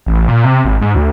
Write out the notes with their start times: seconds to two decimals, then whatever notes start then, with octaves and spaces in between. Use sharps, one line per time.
0.06 A1
0.28 A#2
0.44 C3
0.65 G#1
0.81 G#2
0.95 D2